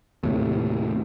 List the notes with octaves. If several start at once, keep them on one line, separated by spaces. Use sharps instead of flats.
D#2 A2 C3